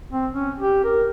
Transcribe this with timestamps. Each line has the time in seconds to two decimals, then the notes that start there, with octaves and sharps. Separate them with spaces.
0.12 C4
0.33 C#4
0.60 G4
0.84 A#4